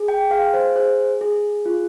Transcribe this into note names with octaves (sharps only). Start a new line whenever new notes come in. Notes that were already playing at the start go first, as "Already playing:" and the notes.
Already playing: G#4
G5
G#4 F5
C5
G#4 C5
G#4
F4